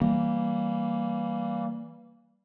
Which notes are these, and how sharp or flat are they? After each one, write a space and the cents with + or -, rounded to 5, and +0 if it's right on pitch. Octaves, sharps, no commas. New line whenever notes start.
E3 +0 G3 +0 A#3 +0